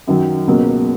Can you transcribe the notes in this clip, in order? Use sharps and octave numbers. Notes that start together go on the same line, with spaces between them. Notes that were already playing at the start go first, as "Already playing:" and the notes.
F#2 D#3 F#3
C#2 B2 F#3 A#3 C#4